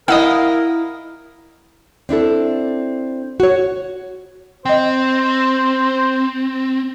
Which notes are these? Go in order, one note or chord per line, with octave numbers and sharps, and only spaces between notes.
E4 A#4 D#5 F5 F#5 D#6
C4 D4 E4 A4
F#4 C#5
C4 C5 D#5 G5